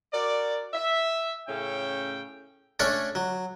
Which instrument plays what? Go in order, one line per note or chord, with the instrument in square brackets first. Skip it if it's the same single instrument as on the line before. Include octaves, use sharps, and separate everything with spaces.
[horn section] F#4 A#4 D5
E5
A2 C#3 C#4 A4 G5
[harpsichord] A3 C#4 D4 C#5 D5
F#3